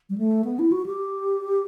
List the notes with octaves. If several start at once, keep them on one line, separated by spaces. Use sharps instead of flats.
G3
A3
B3
E4
F#4
G4